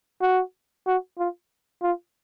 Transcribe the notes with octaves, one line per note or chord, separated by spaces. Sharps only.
F#4
F#4
F4
F4